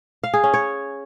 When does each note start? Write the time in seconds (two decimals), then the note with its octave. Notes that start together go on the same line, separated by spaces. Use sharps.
0.24 F5
0.34 G#4
0.44 C#4
0.54 C#5